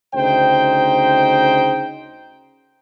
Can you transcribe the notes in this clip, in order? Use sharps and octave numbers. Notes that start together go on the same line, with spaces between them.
D2 C#3 D#4 C5 G5